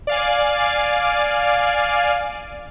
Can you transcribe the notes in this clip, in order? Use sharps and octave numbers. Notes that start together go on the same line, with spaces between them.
D5 F5 G#5